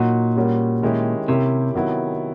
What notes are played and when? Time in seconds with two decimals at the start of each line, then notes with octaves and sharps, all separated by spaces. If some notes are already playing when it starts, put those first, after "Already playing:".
Already playing: A#2 F#3 A#3 D#4 F#4
0.37 G3 A#3 C#4 F#4
0.83 D#3 G#3 C#4 E4 G4
1.28 C3 A#3 C#4 E4 G4
1.74 C3 D#3 F#3 B3 E4